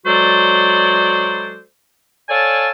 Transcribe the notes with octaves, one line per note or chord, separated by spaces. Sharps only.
F#3 G#3 F#4 A4 C5 D5
A4 C#5 D5 F5 G#5 A5